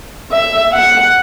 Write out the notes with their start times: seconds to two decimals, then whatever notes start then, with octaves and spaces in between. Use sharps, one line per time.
0.32 E5
0.73 F#5